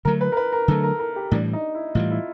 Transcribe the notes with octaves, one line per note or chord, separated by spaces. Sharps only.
D3 F#3 A3 A#4
B4
A#4
B4
A#4
D3 F#3 A3 A4
A#4
A#4
G4
A2 E3 G3 D4
D#4
E4
A2 E3 G3 F4
E4